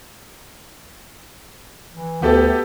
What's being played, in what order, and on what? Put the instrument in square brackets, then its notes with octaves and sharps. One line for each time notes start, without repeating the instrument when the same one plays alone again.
[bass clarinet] E3
[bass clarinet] D2 [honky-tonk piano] B3 G4 A4